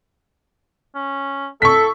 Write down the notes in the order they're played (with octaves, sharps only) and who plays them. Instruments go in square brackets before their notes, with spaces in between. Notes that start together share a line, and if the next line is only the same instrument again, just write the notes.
[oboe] C#4
[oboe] E4 [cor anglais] A4 [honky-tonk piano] C#6 B6